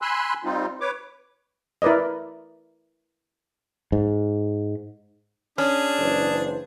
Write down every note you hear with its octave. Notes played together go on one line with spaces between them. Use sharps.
G#5 B5 C6 E6 F#6
G3 C4 D#4 F4
B4 C#5 D6
E4 A#4 B4 D5 D#5
G#2
C#4 D4 G#4
F#1 E3 C5